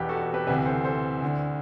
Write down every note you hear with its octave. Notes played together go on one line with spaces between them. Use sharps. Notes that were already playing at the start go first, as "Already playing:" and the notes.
Already playing: E1 E2 B2 G4 B4
F#4 A4
F#4 A4
G4 B4
D2 C3 E3 G4 B4
A4 C5
A4 C5
D2 D3